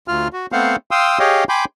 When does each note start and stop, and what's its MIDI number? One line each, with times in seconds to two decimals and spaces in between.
0.08 0.28 38
0.08 0.28 65
0.08 0.28 89
0.33 0.46 66
0.52 0.76 57
0.52 0.76 59
0.52 0.76 60
0.52 0.76 72
0.52 0.76 77
0.52 0.76 78
0.91 1.19 77
0.91 1.19 79
0.91 1.19 84
0.91 1.19 87
0.91 1.19 88
1.19 1.44 67
1.19 1.44 68
1.19 1.44 73
1.19 1.44 75
1.19 1.44 77
1.19 1.44 79
1.49 1.65 79
1.49 1.65 80
1.49 1.65 83
1.49 1.65 84
1.49 1.65 86
1.49 1.65 91